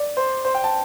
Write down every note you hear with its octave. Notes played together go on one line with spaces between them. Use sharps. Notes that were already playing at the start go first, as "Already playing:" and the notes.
Already playing: D5
C5
C5
G5
A5